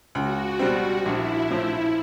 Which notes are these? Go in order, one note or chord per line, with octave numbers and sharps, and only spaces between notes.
C#2 F#4
B2 G3 C4
A#1 E4
A2 F3